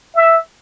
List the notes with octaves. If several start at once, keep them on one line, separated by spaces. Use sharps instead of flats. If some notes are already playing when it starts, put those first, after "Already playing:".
E5